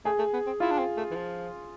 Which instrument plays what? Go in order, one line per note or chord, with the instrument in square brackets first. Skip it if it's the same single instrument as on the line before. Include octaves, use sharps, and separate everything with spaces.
[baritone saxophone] A3 [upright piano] G#4
[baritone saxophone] A3
B3
C4
[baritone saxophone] E4 [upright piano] F4
[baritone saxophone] D4
C4
A3
E3
F3